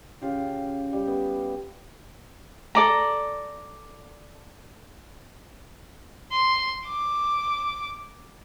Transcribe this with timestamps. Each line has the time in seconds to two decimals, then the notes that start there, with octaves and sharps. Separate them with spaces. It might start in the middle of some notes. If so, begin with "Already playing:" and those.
0.22 C#3 F4 G4
0.93 G3 G4
1.07 B3
2.75 A4 D5 A#5
6.32 C6
6.86 D6